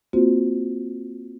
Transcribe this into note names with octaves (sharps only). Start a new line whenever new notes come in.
A#3 C4 F4 F#4 C5